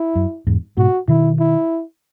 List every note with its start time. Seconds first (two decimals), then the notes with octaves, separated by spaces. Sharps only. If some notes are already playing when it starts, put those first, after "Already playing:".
Already playing: E4
0.15 F#2
0.47 E2 G#2
0.77 G#2 B2 F#4
1.08 B2 D#3 E4
1.39 E4